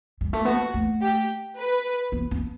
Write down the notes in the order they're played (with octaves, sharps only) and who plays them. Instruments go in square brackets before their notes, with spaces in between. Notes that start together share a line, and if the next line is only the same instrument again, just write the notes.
[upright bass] G3
A3
[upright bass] B3 [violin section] F#4
[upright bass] A3
[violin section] G4
B4
[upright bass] B3
C4